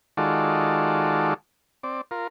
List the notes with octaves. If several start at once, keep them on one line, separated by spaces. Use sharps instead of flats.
D#3 G#3 F4 F#4 A4 D5
C4 D5
F4 A#4